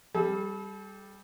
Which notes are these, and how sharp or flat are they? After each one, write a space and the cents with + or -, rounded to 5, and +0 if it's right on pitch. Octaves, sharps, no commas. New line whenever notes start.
G3 +0 A4 -40